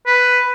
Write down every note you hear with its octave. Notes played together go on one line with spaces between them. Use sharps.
B4